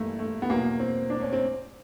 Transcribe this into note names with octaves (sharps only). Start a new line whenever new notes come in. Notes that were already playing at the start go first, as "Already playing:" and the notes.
Already playing: G1 G2 E3 A3 A#3
A3
B3
E2 B2 F#3 A#3
C4
D4
C#4
C4